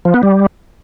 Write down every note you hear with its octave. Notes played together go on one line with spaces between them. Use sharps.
F3
B3
G3